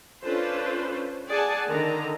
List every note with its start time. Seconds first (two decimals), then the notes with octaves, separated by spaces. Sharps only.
0.24 C#4 D4 F4 A4 B4 C5
1.28 G#4 D5 F#5 G#5 A5
1.68 D3 D#3 A#5